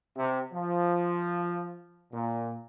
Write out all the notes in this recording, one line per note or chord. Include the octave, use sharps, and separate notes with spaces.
C3
F3
A#2